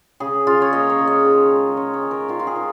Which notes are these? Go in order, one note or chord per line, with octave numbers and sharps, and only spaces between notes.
C#3 G#4
C#3 F4
C#5
A#3 D#5
C#5
C#3
D#5
D#3
G#3
D#5
C#4 C#5
C#5
D#3
A#4
D#3 F4
F4
G#4
D#3